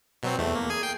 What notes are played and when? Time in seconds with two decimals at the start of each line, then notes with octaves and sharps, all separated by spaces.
0.23 B2 F#3 C4
0.38 E2 A3
0.55 A#3
0.70 G#4 G#5
0.83 G5 C7